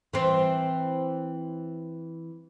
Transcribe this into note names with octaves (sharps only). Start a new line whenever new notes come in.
E3 C4